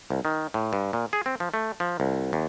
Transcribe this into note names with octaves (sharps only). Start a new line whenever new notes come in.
C2
D#3
A2
G2
A#2
G#4
C4
F3
A3
F3
C2
D#2